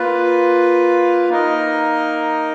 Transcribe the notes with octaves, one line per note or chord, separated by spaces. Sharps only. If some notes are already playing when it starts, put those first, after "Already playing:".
Already playing: A#3 F4 B4
A#3 D#4 A#4 D#5